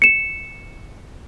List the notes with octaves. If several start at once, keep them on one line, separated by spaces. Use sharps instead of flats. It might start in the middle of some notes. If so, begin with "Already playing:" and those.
C#7 E7